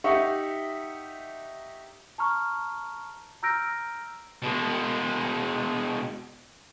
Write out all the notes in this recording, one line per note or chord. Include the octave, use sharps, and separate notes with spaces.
D#4 G4 E5 F#5 C#6
A5 A#5 C#6 F6
A#5 E6 F6 G6 A#6 D7
B2 G#3